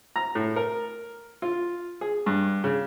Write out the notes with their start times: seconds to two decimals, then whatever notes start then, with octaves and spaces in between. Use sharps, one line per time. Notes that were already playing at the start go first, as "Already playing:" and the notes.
0.16 A#5
0.35 A2
0.56 A#4
1.42 F4
2.01 G#4
2.26 G2
2.64 C#3